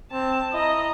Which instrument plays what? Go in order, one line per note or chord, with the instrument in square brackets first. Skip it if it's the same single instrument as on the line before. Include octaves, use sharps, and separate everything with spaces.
[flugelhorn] C4 [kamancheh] A5
[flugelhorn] E4 [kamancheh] D#5 A#5